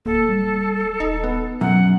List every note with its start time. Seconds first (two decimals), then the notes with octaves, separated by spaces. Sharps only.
0.06 D1 A#3 A4
0.29 G3
1.00 D#1 D#4
1.24 B3
1.61 F#2 B2 F#5